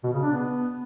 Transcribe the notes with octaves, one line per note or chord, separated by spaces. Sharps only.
B2
C#3
D4
B3